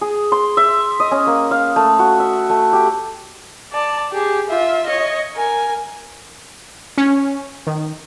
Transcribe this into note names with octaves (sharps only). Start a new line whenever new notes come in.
G#4
C6
E5
D#5
C#4
A#3
F5
A3
F#4
E5
A3
G4
D5 A5
G4 G#4
F4 E5
C#5 D#5
A#4 G#5
C#4
D#3